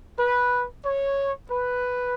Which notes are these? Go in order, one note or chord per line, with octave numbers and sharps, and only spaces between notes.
B4
C#5
B4